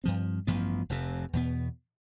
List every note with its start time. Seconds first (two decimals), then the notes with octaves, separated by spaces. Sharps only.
0.04 G2 F3 C4
0.47 A1 G2 F3 B3
0.89 F1 F2 C3
1.33 E2 B2 B3